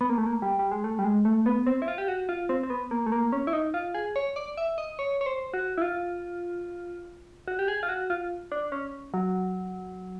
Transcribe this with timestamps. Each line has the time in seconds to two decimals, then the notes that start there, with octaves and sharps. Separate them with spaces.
0.01 B3
0.10 A#3
0.18 A3
0.26 A#3
0.42 G3
0.59 G3
0.71 G#3
0.84 A3
0.99 G3
1.04 G#3
1.25 A3
1.46 B3
1.67 C4
1.82 E4
1.88 F4
1.98 G4
2.08 F#4
2.29 F4
2.49 C4
2.63 C4
2.70 B3
2.91 A#3
3.06 A3
3.12 A#3
3.32 C#4
3.47 E4
3.53 D#4
3.74 F4
3.95 G#4
4.16 C#5
4.36 D5
4.57 E5
4.78 D#5
4.99 C#5
5.21 C#5
5.26 C5
5.54 F#4
5.78 E4
5.82 F4
7.48 F#4
7.59 G4
7.68 G#4
7.83 F4
7.89 F#4
8.10 F4
8.52 D4
8.72 C#4
9.14 F#3